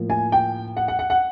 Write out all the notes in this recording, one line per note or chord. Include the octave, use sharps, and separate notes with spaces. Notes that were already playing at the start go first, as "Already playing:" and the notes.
Already playing: A2 F3 A#3
G#5
G5
F#5
F#5
F#5
F#5